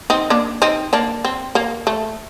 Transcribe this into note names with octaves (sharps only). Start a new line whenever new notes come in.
C4 D#4
A#3 D4
C4 D#4
A#3 D4
C4
A#3
A3